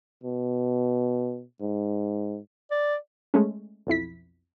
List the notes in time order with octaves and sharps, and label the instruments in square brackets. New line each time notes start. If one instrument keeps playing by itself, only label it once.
[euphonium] B2
G#2
[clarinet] D5
[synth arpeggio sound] G#3 A3 C#4
B1 F2 E4 B6